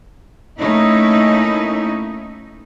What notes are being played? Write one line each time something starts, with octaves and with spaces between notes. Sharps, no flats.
A3 A#3 C#4 D#4 E4